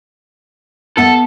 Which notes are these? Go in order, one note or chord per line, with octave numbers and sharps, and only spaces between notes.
B3 A4 E5 F#5